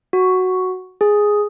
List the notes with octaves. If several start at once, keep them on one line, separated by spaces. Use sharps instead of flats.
F#4
G#4